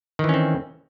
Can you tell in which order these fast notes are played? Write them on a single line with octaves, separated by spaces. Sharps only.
D#3 E3 C#4 C4